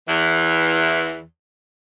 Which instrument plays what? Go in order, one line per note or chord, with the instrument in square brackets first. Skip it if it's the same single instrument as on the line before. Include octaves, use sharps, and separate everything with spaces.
[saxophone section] E2 E3